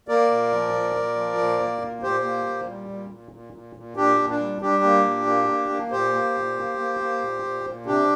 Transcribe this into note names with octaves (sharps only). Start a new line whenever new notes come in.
A#3 A#4 D5
A#2
F3
A#2
A#2
F3
A#2
A#3
A#2
A#2 G4 C5
A#3
A#2
G3
A#2
A#2
A#2
A#2
A#2
A#2 D4 G4
A#2
D4
G3
G3 D4 G4
A#3
A#2
A#3
A#3
A#3
A#2 G4 C5
A#3
A#2
A#3
A#3
A#3
A#2
A#2
A#2
C3 D4 G4